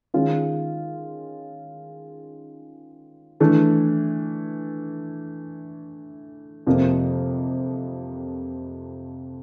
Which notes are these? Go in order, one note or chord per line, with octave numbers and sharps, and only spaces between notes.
D#3 G#3 C#4 F4
E3 A3 D4
F2 C3 F3 A#3